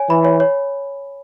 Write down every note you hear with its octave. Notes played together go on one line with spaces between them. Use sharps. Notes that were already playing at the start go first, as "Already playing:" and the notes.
Already playing: C#5 G#5
E3 B5
C#5
C#5